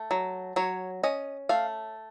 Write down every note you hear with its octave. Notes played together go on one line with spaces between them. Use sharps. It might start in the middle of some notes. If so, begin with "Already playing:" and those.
Already playing: A3
F#3
F#3 C#5
C#4 D#5
A3 F5